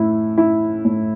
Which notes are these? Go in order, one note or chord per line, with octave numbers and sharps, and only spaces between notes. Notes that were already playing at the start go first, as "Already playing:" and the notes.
Already playing: A2 E4
E4
A2